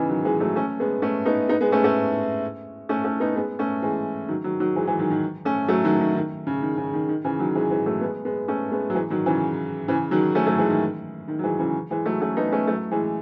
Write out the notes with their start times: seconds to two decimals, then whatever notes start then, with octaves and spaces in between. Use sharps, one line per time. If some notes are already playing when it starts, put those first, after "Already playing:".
Already playing: C#3 E3 B3 D#4
0.09 D#3 F#3
0.25 E3 G#3
0.40 F#3 A3
0.56 A3 C#4
0.80 G#3 B3
1.02 A3 C#4
1.25 B3 D#4
1.49 B3 D#4
1.61 G#3 B3
1.72 A3 C#4
1.84 A3 C#4
2.89 A3 C#4
3.04 A3 C#4
3.20 B3 D#4
3.36 G#3 B3
3.59 A3 C#4
3.82 E3 G#3
4.28 D#3 F#3
4.44 D#3 F#3
4.60 D#3 F#3
4.76 E3 G#3
4.87 E3 G#3
4.99 D#3 F#3
5.10 D#3
5.45 A3 C#4
5.68 F#3 A3
5.84 D#3 F#3
6.00 D#3
6.15 D#3
6.47 C#3
6.62 D#3
6.78 C#3
6.93 D#3
7.09 D#3
7.24 C#3 E3
7.39 D#3 F#3
7.55 E3 G#3
7.71 E3 G#3
7.86 F#3 A3
8.01 G#3 B3
8.25 G#3 B3
8.48 A3 C#4
8.72 G#3 B3
8.90 F#3
8.95 E3 G#3
9.10 D#3 F#3
9.26 C#3 E3
9.88 C#3 E3
10.11 D#3 F#3
10.35 A3 C#4
10.46 F#3 A3
10.58 E3 G#3
10.69 D#3
11.28 D#3
11.39 F#3
11.43 E3 G#3
11.59 C#3 E3
11.91 E3 G#3
12.06 F#3 A3
12.21 A3 C#4
12.37 B3 D#4
12.52 A3 C#4
12.68 F#3 A3
12.91 E3 G#3